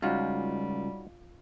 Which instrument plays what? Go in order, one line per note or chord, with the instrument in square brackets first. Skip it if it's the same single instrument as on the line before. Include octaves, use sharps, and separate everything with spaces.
[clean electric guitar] C#2 [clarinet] G3 [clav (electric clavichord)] C#4 D#4 F#4 [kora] F4